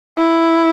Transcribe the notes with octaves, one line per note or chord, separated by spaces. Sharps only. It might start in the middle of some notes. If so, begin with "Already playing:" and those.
E4